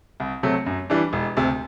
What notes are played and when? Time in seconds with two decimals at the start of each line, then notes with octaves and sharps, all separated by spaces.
0.20 C2
0.43 C3 F#3 A3
0.66 F#2
0.90 E3 G3 D4
1.13 E1
1.37 D2 C3